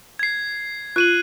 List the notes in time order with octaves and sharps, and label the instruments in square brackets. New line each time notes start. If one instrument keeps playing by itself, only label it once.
[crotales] G#6 C7
[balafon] F4 [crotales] F#6 D#7 F#7